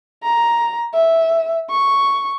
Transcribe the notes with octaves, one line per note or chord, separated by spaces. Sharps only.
A#5
E5
C#6